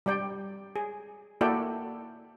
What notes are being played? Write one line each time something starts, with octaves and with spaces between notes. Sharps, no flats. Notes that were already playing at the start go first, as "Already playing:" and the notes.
G3 G4 D5 G5
G#4
A#3 E4 F#4 A4 D5 G5